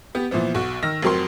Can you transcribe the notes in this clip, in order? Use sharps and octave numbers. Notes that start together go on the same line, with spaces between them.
B3 G4
A#2 E3 F3 B3
B1 F#4 C#6
D#3 E6 F6 A#6
F1 F2 F#3 A#4 C6